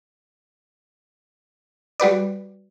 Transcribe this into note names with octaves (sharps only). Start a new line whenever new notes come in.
G3 F#4 B4 D5